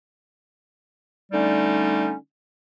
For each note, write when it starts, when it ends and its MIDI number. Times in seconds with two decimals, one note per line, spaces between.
1.32 2.13 50
1.32 2.13 55
1.32 2.13 57
1.32 2.13 61
1.32 2.13 63